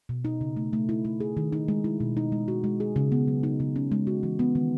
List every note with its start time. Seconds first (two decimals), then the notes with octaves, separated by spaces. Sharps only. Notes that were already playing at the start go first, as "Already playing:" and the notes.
0.09 B2
0.25 D#4
0.41 C#3
0.57 A3
0.73 A3
0.89 E4
1.05 A3
1.20 G#4
1.37 D#3
1.53 D#4
1.68 G#3
1.84 E4
2.00 B2
2.17 D#4
2.32 G#3
2.48 F#4
2.64 G#3
2.80 G#4
2.96 C#3
3.12 B3
3.28 F#3
3.43 D#4
3.60 C#3
3.76 C#4
3.92 G#3
4.07 F#4
4.23 E3
4.39 B3
4.55 D#3